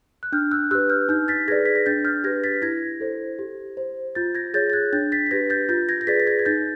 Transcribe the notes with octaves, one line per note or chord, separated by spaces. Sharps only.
F#6
D4 F6 G6
E6 F#6
G4 B4 E6 F#6
F6 G6
D#4 F6 G6
A6 B6
G#4 B4 D5 G#6 A#6
B6
A#6
D4 G6 A6
F6 G6
G4 B4 G#6 A#6
A6 B6
E4 G#6 A#6
A4 C5
G4
C5
F4 G6 A6
G#6 A#6
G#4 C#5 G6 A6
A6
F#6 G#6
D4 G6 A6
A6 B6
B6
G4 B4 G#6 A#6
G6 A6
F4 G6 A6
G#6 A#6
A#6
G#4 B4 D5 A6 B6
A6
G#6 A#6
G#6
D#4 G6 A6